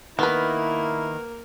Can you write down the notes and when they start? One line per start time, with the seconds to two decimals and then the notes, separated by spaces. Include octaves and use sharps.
0.19 D#3 A#3 B3 E4 A#4 B4